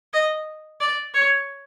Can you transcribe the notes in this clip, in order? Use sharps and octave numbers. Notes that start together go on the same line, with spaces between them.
D#5
D5
C#5